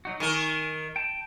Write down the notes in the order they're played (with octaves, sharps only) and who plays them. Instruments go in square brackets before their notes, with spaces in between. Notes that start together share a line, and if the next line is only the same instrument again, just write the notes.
[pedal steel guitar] F#3 D#4 F#4
[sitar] D#3 A#4 [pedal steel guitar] G#5 C#6 D6
[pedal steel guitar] G5 A5